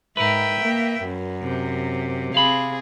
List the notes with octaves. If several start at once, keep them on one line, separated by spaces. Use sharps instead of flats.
G#2 A#4 B4 E5 G5
A#3
F#2
C3
C4 G#4 F5 B5